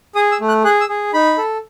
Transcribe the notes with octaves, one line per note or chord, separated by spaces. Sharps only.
G#4 D#6
E6
A3
F#6
G#4 F#6
E6
G#4
D#4 B5
A4